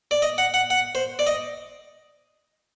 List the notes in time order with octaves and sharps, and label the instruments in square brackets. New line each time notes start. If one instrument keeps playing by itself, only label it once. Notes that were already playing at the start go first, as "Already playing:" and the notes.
[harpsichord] D5
D#5
F#5
F#5
F#5
C5
D5
D#5